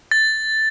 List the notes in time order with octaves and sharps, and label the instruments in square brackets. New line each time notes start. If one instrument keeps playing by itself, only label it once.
[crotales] A6